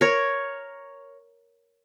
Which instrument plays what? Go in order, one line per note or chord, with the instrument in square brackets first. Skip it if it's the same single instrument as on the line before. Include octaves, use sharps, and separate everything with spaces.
[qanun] A#4 C#5